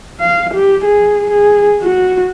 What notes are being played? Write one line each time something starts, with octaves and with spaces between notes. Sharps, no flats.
F5
G4
G#4
G#4
F#4